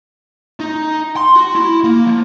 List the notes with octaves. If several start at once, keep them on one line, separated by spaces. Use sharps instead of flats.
D#4
C6
F#4
E4
A#3
F3